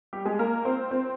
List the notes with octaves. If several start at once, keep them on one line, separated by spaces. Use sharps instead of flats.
G3 G4
G#3 G#4
A#3 A#4
C4 C5
C4 C5